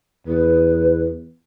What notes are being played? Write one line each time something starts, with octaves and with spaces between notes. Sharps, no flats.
E2 B4